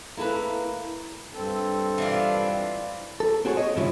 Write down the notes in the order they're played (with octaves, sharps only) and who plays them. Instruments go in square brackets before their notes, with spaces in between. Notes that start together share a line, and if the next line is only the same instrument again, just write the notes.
[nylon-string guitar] A#3 E4 A4 B4
[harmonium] G2 C4 A4
[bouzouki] E3 D4 F4
[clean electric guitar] A4
C4 F#4 G#4 C5 C#5
C#5 D#5
F2 G#2 C#3 F3 G3 E4